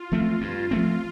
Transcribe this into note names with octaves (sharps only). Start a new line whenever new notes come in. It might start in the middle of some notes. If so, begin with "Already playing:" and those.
Already playing: F4
F3 A3 C4
G2
F3 A3 C4